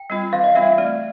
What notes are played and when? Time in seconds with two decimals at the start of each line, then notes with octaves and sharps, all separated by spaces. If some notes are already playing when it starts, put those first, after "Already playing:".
Already playing: G5
0.10 G3 C4 F4
0.33 E3 F5
0.44 D#5
0.55 G3 C4 F4 E5
0.78 A3 D5